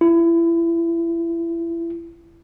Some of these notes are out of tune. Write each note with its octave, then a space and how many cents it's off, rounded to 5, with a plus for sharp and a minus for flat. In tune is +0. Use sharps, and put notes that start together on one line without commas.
E4 +25